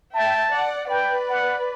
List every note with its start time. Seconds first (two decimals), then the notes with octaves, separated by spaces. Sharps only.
0.14 E5 G5 A5
0.52 D5 F#5
0.90 B4 D5 G5
1.29 F#5